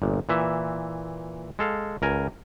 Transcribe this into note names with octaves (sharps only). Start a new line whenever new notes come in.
G1 A#2
A#2 E3 E5
G#3 A4 F5
C#2 A#4 G#5